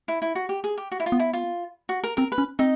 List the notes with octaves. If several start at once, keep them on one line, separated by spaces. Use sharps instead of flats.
E4
E4
F#4
G4
G#4
G4
F#4
E4
F4
B3
E4
F4
F#4
A#4
C4 A#4
B4
C#4
C4 D#4 D#5